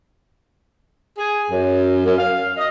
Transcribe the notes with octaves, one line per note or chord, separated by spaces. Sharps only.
G#4
F#2
F#2
F5
D#5